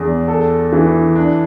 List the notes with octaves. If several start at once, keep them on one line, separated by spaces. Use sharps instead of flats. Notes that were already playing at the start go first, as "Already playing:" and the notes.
Already playing: E2 D4
A4
E3
D4